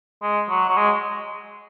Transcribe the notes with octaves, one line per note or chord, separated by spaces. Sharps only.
G#3
F#3
F#3
G#3